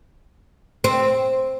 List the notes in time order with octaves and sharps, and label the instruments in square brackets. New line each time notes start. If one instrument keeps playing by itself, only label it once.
[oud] C4